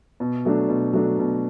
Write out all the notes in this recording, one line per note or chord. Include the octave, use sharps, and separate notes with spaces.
B2
F#3 A3 D4
B2
F#3 A3 D4
B2